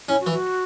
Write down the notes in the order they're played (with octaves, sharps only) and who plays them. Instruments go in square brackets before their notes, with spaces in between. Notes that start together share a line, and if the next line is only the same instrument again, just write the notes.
[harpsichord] C#4 [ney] E4
[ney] F#4
[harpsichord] E3
[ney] F#4